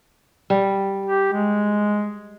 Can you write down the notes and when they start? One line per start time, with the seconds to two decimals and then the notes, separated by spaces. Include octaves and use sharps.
0.50 G3
1.06 G4
1.33 G#3